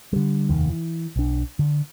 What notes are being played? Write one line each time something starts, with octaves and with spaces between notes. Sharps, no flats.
D3 G3
F1 D#2 D#3
E3
B1 D4
D3